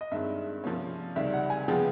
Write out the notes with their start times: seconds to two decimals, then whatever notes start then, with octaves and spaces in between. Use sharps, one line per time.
0.01 D#5
0.11 G2 D#3 G#3 C4 E5
0.64 C3 F3 A#3 C#4
1.16 C#2 C3 D#3 G3 E5
1.34 F#5
1.50 G#5
1.68 C#3 F3 G#3 B3 G5